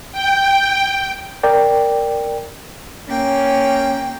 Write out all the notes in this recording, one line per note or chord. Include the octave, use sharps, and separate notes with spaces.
G5
A#4 D5 G5
A#3 C#4 G5